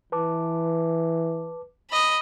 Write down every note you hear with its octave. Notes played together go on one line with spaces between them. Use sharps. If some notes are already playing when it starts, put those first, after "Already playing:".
E3 B4 A5 D6
D#5 B5